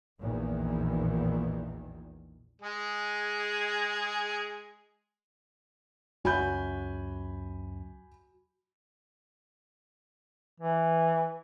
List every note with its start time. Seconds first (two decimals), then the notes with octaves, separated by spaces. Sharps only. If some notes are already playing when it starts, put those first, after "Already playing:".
0.18 A#1 E2 A#2 D#3
2.62 G#3 G#4
6.25 C#2 F#2 F#4 G#5 B5 G6
10.60 E3